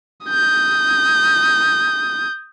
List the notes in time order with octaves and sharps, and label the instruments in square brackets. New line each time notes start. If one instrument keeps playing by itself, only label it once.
[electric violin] D#6 G6